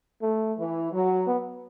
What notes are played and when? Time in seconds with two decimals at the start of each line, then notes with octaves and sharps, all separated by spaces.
0.22 A3
0.57 E3
0.92 F#3
1.27 B3